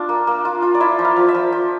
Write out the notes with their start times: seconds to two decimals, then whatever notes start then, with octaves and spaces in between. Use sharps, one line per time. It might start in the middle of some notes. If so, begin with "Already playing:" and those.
Already playing: D4 F4
0.09 A#3
0.27 A#3
0.45 F4
0.62 F4
0.75 D5
0.80 E4 E5
0.99 F3
1.04 F5
1.16 F3
1.28 E5
1.34 F3
1.52 F3